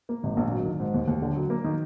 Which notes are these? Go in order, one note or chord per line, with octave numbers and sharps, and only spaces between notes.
A#3
G#1
A#1
F#3
D#3
G#2
D#2
D#2
D3
F#3
A#3
D#3